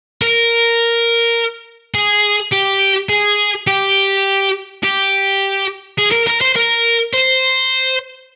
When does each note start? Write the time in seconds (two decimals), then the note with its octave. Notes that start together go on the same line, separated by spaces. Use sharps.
0.22 A#4
1.95 G#4
2.53 G4
3.09 G#4
3.67 G4
4.83 G4
5.99 G#4
6.12 A#4
6.27 A#4
6.41 C5
6.56 A#4
7.14 C5